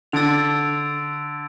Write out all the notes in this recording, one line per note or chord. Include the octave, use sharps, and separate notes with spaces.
D3 E6 A6 D7 F7